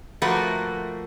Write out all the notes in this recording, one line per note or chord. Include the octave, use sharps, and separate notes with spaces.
F3 A3 A#3 F#4 B4